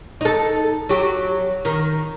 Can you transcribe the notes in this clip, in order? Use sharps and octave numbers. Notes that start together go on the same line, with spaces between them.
D#4 A4
F#3 G4
D#3